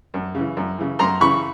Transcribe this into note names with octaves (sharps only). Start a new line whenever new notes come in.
F#2
C#3 E3
F#2
C#3 E3
F#2 A#5 C6
C#3 E3 B5 C#6